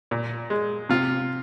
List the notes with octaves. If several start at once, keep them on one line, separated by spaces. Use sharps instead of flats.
A#2
G#3
C3 F4